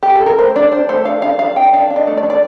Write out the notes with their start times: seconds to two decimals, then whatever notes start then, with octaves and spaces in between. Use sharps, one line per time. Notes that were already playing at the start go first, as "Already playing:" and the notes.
0.03 G4
0.16 A4
0.26 A#4
0.38 A3 C5
0.56 D4 D5
0.72 D4 C5
0.89 A3 C5
1.05 D4 F5
1.22 D4 F5
1.39 D4 F5
1.56 D4 G5
1.73 D4 F5
1.90 D4
1.96 D#5
2.07 A3
2.17 D5
2.23 D4
2.30 D5